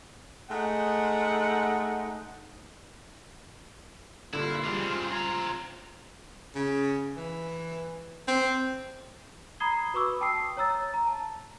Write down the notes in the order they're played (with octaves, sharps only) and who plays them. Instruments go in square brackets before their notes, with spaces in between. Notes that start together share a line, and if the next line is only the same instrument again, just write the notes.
[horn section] G#3 A3 D#4 F#5
[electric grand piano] G2 A#2 D3 [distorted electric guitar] E4 [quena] F4
[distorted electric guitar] E3 D4 [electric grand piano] G3 G#3
[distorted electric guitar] C#3 C4
[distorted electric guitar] C4 A#5 [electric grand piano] G#6
[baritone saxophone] C#3
E3
C4
[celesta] A#5 B5 D#6 G#6 C7 G7
F#4 B4 B5 C#6 D6 E6
G5 A5 D#6 E6 C7
C#5 A#5 E6 A6
A#5
A5